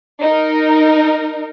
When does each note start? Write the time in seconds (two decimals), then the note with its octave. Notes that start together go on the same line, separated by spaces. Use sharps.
0.21 D#4 A#4